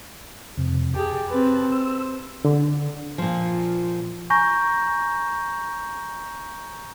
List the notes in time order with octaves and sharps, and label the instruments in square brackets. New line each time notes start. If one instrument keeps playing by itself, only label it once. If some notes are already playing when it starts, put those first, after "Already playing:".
[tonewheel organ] F2 C3
[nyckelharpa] G4 G#4 [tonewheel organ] A5
[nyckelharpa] C4 B4
[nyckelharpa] C5 [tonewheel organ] E6
[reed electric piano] D3
[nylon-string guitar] A#2 F3
[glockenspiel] G#5 A#5 C#6 G6 A#6